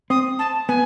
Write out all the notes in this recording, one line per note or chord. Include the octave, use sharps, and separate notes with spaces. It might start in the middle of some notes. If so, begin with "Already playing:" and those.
C4 D#6
A5
B3 G#5